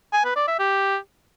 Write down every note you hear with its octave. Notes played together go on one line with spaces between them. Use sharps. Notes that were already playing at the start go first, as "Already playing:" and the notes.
G#5
B4
D5
E5
G4